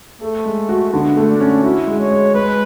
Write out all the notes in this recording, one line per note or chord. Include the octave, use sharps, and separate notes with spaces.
A3 A4
G#3
F#4
D3 B3
A3
D4
C#4
E4 F#4
G#3
C#5
G#3
G#3 B4